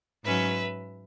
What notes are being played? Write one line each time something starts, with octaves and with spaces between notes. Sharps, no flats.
G#2 F#3 C#4 B4 E5